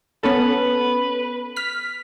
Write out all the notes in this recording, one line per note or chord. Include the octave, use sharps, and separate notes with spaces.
B3 C#4 A4 B4
F6 B6